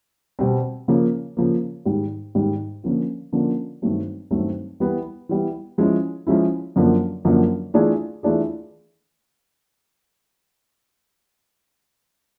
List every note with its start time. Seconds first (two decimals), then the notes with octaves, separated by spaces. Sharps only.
0.39 B2 G3 C4
0.88 C#3 F3 A#3
1.37 C#3 F3 A#3
1.85 G#2 D#3 G3
2.35 G#2 D#3 G3
2.84 D3 F3 A#3 C#4 F4
3.33 D3 F3 A#3 C#4 F4
3.82 G2 D#3 F#3 A3 C4
4.31 G2 D#3 F#3 A3 C4
4.80 E3 G3 B3
5.29 E3 G3 B3
5.78 F3 G#3 C#4 E4
6.27 F3 G#3 C#4 E4
6.76 F#2 D3 F3 A#3
7.25 F#2 D3 F3 A#3
7.74 E3 A3 D4 F4 G#4
8.23 E3 A3 D4 F4 G#4